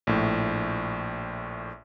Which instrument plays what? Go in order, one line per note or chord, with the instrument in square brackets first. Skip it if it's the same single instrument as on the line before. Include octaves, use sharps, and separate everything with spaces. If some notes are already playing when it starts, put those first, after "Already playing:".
[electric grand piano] A#1 A2